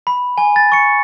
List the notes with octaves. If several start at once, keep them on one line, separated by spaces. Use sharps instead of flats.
B5
G#5
A6
C#6 C#7